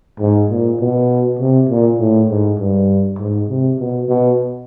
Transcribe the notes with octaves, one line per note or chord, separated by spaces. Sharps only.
G#2
A#2
B2
C3
A#2
A2
G#2
G2
G#2
C3
B2
B2